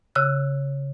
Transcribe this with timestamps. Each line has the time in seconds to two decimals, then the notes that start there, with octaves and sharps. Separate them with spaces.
0.15 C#3 E6 F#6